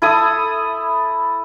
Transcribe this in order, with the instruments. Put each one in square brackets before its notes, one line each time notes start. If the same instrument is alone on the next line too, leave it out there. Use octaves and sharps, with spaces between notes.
[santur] E4 A4 D#6